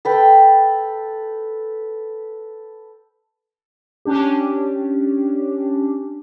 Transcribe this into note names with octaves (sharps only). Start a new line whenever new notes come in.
A4 B4 G5
C#4 D4 G4